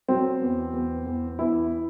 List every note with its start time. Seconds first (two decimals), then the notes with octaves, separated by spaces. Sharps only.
0.08 F#3 C4
0.42 E2
0.73 E2
1.06 E2
1.39 E2 E4